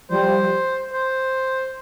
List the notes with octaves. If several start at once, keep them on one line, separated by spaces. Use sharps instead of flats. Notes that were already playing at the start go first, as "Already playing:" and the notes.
F3 G3 C5
C5